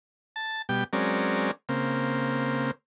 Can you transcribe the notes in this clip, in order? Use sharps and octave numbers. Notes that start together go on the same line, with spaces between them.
A5
B2 G3 G5
F#3 G#3 C4 C#4 A#4 D5
C#3 A#3 C4